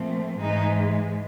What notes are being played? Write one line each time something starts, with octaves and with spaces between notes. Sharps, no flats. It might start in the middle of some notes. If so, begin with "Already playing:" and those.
Already playing: A#2 F3 A3 C4
G#2 E3 G#3 D#4